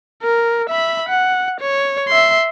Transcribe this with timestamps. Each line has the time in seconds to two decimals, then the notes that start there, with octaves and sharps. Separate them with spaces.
0.23 A#4
0.69 E5 B5
1.09 F#5
1.60 C#5
2.08 E5 C6